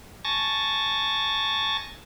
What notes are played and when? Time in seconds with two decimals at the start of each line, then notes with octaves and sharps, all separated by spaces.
0.25 G#5 A5 C#6 A6 A#6